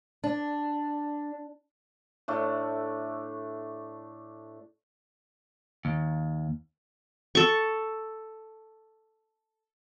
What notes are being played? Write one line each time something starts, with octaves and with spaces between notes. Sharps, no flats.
D4
A2 A3 D4
D#2
A4 C#6